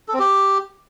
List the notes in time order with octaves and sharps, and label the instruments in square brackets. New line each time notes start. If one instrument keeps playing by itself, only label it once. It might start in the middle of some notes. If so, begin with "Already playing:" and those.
[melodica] A4
C4
G4